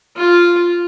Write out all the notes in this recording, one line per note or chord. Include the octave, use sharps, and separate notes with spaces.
F4